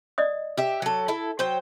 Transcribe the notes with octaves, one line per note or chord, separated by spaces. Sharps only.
D5 D#5 D#6
G4 E5
F#3 A4
E4 A4
F#3 C5 G5